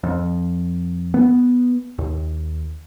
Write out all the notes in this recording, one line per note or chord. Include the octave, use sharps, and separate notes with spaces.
F2
B3
D#2